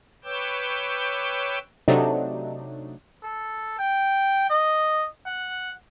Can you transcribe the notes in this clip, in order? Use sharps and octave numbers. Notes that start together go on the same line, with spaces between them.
B4 C#5 G5 D6 E6 G6
C3 F#3 A3 D4 D#4
A4
G5
D#5
F#5